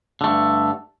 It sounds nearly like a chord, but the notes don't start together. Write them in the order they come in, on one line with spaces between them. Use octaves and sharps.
D3 A3 G2